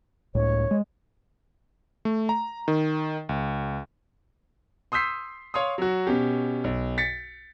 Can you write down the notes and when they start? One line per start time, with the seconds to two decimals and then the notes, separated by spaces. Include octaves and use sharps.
0.35 C#2 A2 C#5
0.71 G#3
2.05 A3
2.29 A#5
2.68 D#3
3.29 C#2
4.92 C6 D#6 E6 G6 B6 C7
5.54 C#5 F5 C6 D#6
5.78 F#3 F#4
6.07 B2 C#4 G4
6.64 B1
6.98 A6 B6 C#7